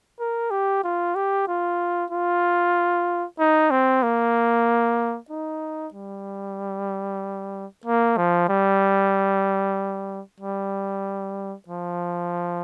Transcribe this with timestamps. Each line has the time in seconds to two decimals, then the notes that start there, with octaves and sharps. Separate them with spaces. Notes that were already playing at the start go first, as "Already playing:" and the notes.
0.20 A#4
0.51 G4
0.84 F4
1.15 G4
1.48 F4
2.10 F4
3.39 D#4
3.71 C4
4.03 A#3
5.30 D#4
5.94 G3
7.85 A#3
8.17 F3
8.49 G3
10.40 G3
11.68 F3